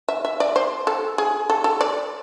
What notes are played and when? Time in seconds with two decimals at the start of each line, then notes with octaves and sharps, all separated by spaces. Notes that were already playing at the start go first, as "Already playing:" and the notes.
0.09 E5
0.25 E5
0.40 D5
0.56 C5
0.87 A4
1.18 G#4
1.50 A4
1.64 A4
1.81 D5